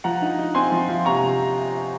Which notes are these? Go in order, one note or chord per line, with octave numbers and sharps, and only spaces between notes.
F3 F#5 A#5
D#4
D#4
C4 G#5 C6
F3
F3
C3 A#5 C#6